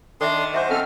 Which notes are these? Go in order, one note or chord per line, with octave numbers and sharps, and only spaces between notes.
D#3 D4 A4 D5 E5 C6
F#4 C5 E5 G#5 D6
C4 C#4 A4 F5 G#5 F6